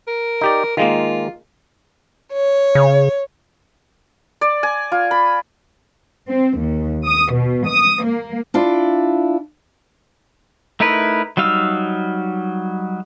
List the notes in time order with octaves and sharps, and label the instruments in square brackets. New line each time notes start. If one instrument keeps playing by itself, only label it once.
[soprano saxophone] A#4
[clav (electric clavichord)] D#4 G4 D5
[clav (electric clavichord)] D#3 G#3 A#3 [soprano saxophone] F4
[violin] C#5
[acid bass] C#3
[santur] D5
G#5
F4
B5
[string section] C4
D#2
D#6
B2
D#6
A#3
[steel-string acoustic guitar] D4 E4 F4 D5
[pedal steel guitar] A3 D#4 E4 A#4 B4
F#3 G3 D#4 F5 E6